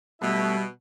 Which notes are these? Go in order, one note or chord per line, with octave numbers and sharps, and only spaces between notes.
B2 G3 A3 B3 E4 E5